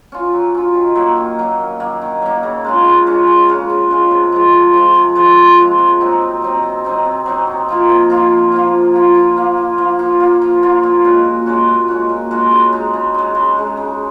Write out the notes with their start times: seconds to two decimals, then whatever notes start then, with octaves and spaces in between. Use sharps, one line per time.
0.12 C#4 F4
0.33 F#3
0.54 C#4 F4
0.74 D#3
0.95 F#3 A#3
1.17 D#3
1.39 F#3 A#3
1.59 D#3
1.80 F#3 A#3
2.02 D#3
2.22 F#3 A#3
2.43 C#3
2.64 G#3 C#4 F4
2.84 C#3
3.07 G#3 C#4 F4
3.27 C#3
3.48 G#3 C#4 F4
3.70 C#3
3.90 G#3 C#4 F4
4.11 C3
4.32 F3 G#3
4.53 C3
4.73 F3 G#3
4.95 C3
5.15 F3 G#3
5.37 C3
5.59 F3 G#3
5.79 C3
6.01 F#3 C4 D#4
6.21 C3
6.42 F#3 C4 D#4
6.63 C3
6.85 F#3 C4 D#4
7.05 C3
7.26 F#3 C4 D#4
7.47 C3
7.69 F3 A#3 F4
7.89 C3
8.10 F3 A#3 F4
8.31 C3
8.52 F3 A#3 F4
8.73 C3
8.94 F3 A#3 F4
9.15 F3
9.37 A#3 F4
9.57 F3
9.78 A#3 F4
9.99 F3
10.20 A#3 F4
10.42 F3
10.63 A#3 F4
10.83 A#2
11.05 G#3 C#4 F#4
11.25 A#2
11.46 G#3 C#4 F#4
11.68 A#2
11.88 G#3 C#4 F#4
12.09 A#2
12.31 G#3 C#4 F#4
12.52 C#3
12.72 G#3 D#4
12.94 C#3
13.14 G#3 D#4
13.35 C#3
13.57 G#3 D#4
13.77 C#3